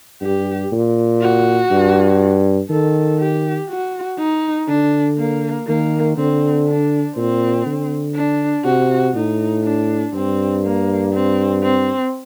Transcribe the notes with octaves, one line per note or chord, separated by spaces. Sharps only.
G2 G4
A#2
F#4
G2
D#3 A4
G4
F#4
D#4
D3 D4
A#3
D#3 A#3
D3 C4
D4
A#2 C4
D3
D4
C3 F#4
A2 D#4
D4
G2 C4
A#3
C4
C4